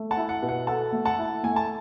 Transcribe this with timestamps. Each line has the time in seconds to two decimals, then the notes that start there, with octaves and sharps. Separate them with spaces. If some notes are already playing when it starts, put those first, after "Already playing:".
Already playing: A3
0.11 F#5 A5
0.17 E4
0.29 F#5
0.42 B2
0.49 F#5
0.67 A4 F#5 A5
0.92 A3
1.05 F#5 A5
1.19 E4
1.43 A3 G#5
1.56 A5